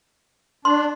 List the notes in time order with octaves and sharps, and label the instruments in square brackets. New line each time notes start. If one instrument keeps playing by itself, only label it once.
[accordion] D4 [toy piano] C6